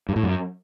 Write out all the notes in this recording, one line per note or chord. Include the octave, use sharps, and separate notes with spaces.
G2
A2
F#2